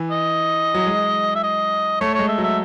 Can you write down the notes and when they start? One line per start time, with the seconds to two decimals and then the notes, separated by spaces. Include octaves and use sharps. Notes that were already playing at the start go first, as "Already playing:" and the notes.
Already playing: E3
0.11 D#5
0.74 F#3
0.87 G#3
1.35 E5
1.43 D#5
2.01 A3 C#5
2.14 G#3 C#5
2.29 E5
2.38 F#3
2.44 E5